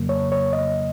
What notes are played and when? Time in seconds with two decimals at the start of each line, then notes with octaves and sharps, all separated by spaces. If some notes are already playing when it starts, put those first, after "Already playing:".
Already playing: F2 C#3 F#3 A#3
0.09 C#5
0.32 C#5
0.53 D#5